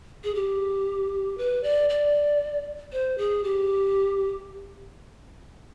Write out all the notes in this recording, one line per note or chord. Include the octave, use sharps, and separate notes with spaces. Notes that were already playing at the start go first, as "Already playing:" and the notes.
G#4
G4
B4
D5
D5
C5
G#4
G4